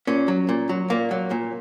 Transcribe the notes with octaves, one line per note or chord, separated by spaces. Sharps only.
A#2 C#4
F#3
A#2
F#3
A#2 A#3
F#3
A#2